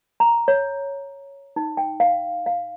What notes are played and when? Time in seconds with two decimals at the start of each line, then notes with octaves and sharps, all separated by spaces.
0.20 A#5
0.48 C#5
1.56 D#4
1.77 G5
2.00 F5
2.46 F5